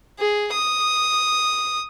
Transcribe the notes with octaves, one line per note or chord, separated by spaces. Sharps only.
G#4
D#6